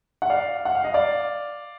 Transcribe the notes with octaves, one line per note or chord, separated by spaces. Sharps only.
F#5
D5 F5
F#5
F5
D#5
D5 F5